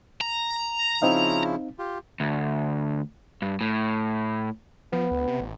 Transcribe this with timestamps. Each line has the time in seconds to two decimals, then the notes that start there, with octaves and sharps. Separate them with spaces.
0.21 A#5
1.02 C#3 F3 C4 D#4 E4 F5
1.79 F4 G4
2.20 D2
3.42 G2
3.61 A2
4.93 F3 B3
5.11 D2
5.27 C3
5.41 A1